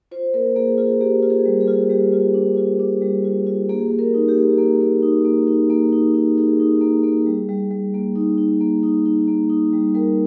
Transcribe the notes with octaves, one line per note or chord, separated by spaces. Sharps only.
F4 C5
A#3 A#4
A#3 G#4
F4 G#4
A#3 G4
F4
G#4
G3
G#4
F4
G3 G4
F4
D4
F4
D4
G3
F4
F4
A#3 G#4
A#3
A#4
D#4
G4
A#3
A#3
A#3
D#4
A#3
D#4
A#3
D#4
D#4
D#4 G#4
D#4
A#3
A#3
G3
G3
G3
A#3
D#4
D#4
A#3
D#4
D#4
A#3
D#4
G3
G3 A#4